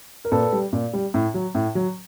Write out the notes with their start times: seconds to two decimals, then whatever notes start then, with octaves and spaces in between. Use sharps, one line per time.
0.25 A#4
0.31 A#2 A4 B4
0.52 G3
0.73 A#2
0.93 G3
1.14 A2
1.34 F#3
1.55 A2
1.75 F#3